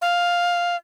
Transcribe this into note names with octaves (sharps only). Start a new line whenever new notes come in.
F5